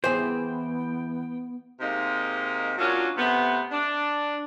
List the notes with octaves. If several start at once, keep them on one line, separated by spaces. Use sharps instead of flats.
E3 B3 G#4 C5 G5
C3 G#3 A#3 D#4
F#3 A#3 C#4 D4 F4
C3 A3 B3
D4